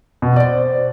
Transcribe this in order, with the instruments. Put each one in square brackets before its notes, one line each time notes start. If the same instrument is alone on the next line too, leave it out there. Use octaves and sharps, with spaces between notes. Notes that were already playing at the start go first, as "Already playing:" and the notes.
[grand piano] B2
[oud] C4 C5 [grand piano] D5